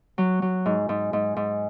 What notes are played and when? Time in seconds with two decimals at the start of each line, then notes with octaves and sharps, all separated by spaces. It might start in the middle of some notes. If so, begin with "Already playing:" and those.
0.18 F#3
0.42 F#3
0.66 G#2
0.89 G#2
1.13 G#2
1.36 G#2